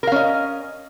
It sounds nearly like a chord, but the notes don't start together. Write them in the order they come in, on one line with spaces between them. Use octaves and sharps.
A#4 F5 C#4 D#5